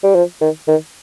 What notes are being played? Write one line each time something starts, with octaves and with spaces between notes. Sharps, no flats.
G3
F3
D#3
D#3